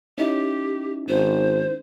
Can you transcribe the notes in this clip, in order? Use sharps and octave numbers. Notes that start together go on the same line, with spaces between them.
C#4 D#4 E4 G4
G#1 C5